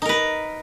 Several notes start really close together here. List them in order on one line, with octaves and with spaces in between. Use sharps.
D#4 A#4 B4